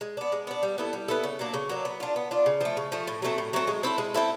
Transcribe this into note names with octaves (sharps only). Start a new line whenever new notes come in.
G#3
B3 D4
G#3
B3 D4
G3
B3 E4 A4
G3
B3 E4 A4
C#3
F#3 A#3 D4
C#3
F#3 A#3 D4
B3
D4 F4
B3
D4 F4
C#3
F3 A3
C#3
F3 A3
A2
F#3 A3 C4
A2
F#3 A3 C4
G#3
C4 E4 A4
G#3
C4 E4 A4